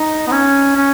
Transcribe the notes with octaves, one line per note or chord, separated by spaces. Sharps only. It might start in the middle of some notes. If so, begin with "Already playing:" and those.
Already playing: D#4
B3
C#4
C#4